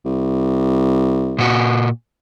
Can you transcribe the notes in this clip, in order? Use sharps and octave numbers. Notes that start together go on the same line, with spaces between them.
C2
A#2 F#4